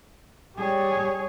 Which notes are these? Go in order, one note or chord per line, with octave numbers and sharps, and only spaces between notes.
G3 G#4 C#5